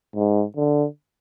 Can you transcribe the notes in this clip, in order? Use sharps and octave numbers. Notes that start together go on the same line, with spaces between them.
G#2
D3